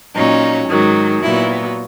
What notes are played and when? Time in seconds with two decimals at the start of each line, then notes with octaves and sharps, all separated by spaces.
0.14 A#2 F#3 C#4 D#4
0.68 G#2 D#3 F#3
1.22 A#2 F#3 B3 E4